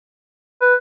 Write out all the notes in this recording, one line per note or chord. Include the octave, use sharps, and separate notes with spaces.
B4